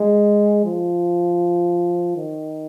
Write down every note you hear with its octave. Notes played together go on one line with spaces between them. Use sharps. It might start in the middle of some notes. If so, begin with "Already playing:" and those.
Already playing: G#3
F3
D#3